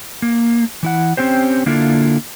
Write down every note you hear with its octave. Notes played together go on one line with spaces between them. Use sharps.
A#3
E3 E4 F#5
C4 C#4 G4 C5
D3 A#3 D4 E4 F4 A4